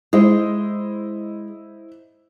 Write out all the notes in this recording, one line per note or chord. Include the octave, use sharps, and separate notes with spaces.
G#3 E4 C5 D#5